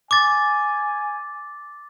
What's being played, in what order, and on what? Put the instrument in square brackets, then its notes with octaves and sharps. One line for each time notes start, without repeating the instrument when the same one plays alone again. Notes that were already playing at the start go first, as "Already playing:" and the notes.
[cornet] G#5 [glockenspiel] D6 A6